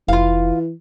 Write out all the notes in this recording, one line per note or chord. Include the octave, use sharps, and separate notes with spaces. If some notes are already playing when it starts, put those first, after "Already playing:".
F1 E3 F4 F5